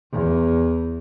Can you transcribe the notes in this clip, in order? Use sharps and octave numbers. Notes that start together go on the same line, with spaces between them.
E2